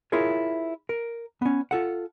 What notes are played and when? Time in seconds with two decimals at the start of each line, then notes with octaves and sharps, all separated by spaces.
0.12 E4 F4 G#4 A#4 C#5
0.89 A#4
1.42 B3 C#4
1.71 F4 A4 F#5